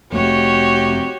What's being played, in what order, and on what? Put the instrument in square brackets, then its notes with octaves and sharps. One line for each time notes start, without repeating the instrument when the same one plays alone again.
[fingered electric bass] F1 A3 [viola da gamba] F#4 G4 C#5